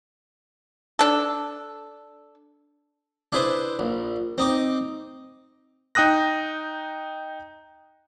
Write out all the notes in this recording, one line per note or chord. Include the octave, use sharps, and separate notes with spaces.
D4 A4
D4 E4 G#4 B4 C5
A#1
C4 D#4 D#5 D6
D#4 G5 D#6 F#6 A#6